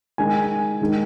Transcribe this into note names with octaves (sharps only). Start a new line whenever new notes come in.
D#3 G#3 D#4 G#5
D#3 G#3 D#4